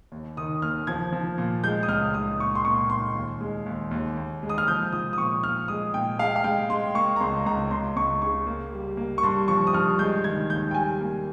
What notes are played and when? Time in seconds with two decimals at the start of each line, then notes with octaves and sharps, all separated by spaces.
0.12 D#2
0.37 D#3 D#6
0.62 D#2 F6
0.87 F3 G#6
1.13 F3
1.38 A#2
1.64 G#3 G6
1.83 D#6
1.88 C#2 F6
2.14 G#3 D#6
2.40 A#2 C#6
2.55 C6
2.65 A#2 C#6
2.90 A#2 C6
3.15 D#2
3.41 G#3
3.66 D#2
3.91 D#2
4.17 D#2
4.43 G#3
4.49 D#6
4.58 F6
4.68 F3 G6
4.92 F3 D#6
5.13 D#6
5.18 A#2 C#6
5.44 A#2 F6
5.68 G#3 D#6
5.94 A#2 G5
6.19 G#3 F5
6.36 F5
6.44 G#3 G5
6.69 G#3 C6
6.95 A#3 C#6
7.16 A#5
7.20 C#2 C6
7.46 C#2 A#5
7.71 C#2 C6
7.96 C#2 C#6
8.22 C#3 C#6
8.47 A#3
8.72 G3
8.97 A#3
9.18 C#6
9.23 G2 C6
9.48 F3 C#6
9.67 D#6
9.73 G2 F6
9.99 G#3 G6
10.24 D#3 G#6
10.49 D#2 G6
10.71 G5
10.74 G3 G#5
11.01 A#3